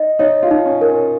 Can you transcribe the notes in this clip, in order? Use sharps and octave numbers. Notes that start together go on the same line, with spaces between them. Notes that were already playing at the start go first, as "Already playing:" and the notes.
Already playing: D#4 D#5
D#4 C#5
F4
D#4
C#4
A#4
C#4